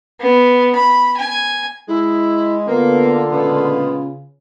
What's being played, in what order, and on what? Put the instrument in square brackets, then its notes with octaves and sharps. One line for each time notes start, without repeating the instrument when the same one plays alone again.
[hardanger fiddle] B3
B5
G#5
[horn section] G#3 [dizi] E4
[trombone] D3 [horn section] A#3 [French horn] B3 [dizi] F4
[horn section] A#2 G#3 B3 [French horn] C#3